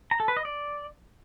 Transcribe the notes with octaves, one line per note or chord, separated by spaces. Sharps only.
A#5
A4
B4
D#5
D5